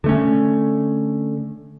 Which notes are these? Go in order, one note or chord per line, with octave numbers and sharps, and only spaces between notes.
D3 A3 C#4